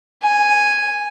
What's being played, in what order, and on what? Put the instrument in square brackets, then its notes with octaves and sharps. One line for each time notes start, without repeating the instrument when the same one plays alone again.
[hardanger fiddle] G#5